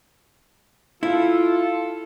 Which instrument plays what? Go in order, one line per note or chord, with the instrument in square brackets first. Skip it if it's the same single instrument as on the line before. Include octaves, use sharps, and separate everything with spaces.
[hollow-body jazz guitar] E4 [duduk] F4 [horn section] A4